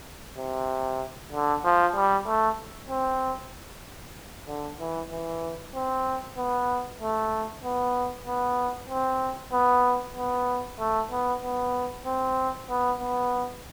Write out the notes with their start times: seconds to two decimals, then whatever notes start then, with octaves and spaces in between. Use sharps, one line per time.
0.38 C3
1.32 D3
1.65 F3
1.96 G3
2.27 A3
2.90 C4
4.48 D3
4.80 E3
5.11 E3
5.75 C4
6.38 B3
7.01 A3
7.64 B3
8.28 B3
8.90 C4
9.53 B3
10.17 B3
10.79 A3
11.11 B3
11.43 B3
12.06 C4
12.70 B3
13.00 B3